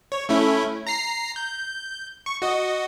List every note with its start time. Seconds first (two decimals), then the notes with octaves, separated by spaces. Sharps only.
0.12 C#5
0.29 A3 C#4 E4
0.87 A#5 A#6 C7
1.36 G6
2.26 C#6
2.42 F#4 D#5